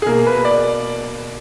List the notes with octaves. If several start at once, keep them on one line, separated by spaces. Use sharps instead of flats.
G#4
B2 A#3 A#4
B4
D5